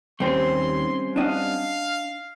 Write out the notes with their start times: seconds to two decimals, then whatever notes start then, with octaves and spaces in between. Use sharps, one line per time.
0.20 D#2 G3 C4 C#4 C5 C6
1.16 D4 D#5 F5 F#5